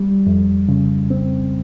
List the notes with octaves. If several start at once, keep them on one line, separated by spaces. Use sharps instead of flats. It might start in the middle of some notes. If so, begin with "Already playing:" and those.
Already playing: G3
F2
C#3
C4